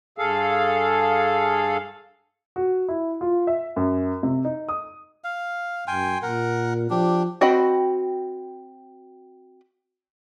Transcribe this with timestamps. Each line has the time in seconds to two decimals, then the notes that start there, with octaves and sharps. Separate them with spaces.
0.18 G2 G#4 A4 F5
2.56 F#4
2.89 E4
3.21 F4
3.47 E5
3.76 F#2
4.23 C3
4.45 D#4
4.69 D#6
5.24 F5
5.88 F#2 G5 G#5 C6
6.22 A#2 A#4 F#5
6.90 F3 D4 G4
7.41 C4 F#4 D#5 G5 B5